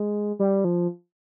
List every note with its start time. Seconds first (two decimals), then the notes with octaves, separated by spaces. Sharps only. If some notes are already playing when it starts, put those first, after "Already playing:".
Already playing: G#3
0.39 G3
0.64 F3